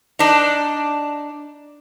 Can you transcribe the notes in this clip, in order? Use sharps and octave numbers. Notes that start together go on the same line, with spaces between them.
D4 D#4